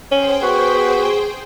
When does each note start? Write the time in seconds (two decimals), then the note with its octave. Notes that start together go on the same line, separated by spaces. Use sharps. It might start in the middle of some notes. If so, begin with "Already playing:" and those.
0.12 C#4 G#4 C5 G5
0.42 B3 F#4